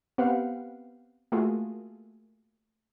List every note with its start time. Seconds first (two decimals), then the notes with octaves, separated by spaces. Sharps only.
0.18 B3 C4 G4 B4 F5 F#5
1.32 A3 A#3 F4 F#4 G#4 A4